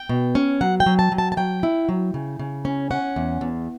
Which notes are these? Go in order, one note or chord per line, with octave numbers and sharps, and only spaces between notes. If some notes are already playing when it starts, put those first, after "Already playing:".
Already playing: G5
B2
C#4
F#3 F#5
G5
F#3
A5
F#3
A5
A5
F#3 G5
E4
F#3
C#3
C#3
C#4
C#4 F#5
E2
E2